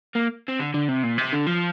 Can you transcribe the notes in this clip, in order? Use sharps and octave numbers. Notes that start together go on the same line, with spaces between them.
A#3
C4
D3
D3
C3
A#2
C3
D3
F3